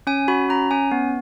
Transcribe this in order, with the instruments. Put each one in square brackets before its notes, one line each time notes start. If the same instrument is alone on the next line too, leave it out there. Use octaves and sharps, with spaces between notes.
[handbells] C#4 G#5
F#4 B5
C#4 A#5
C#4 G#5
B3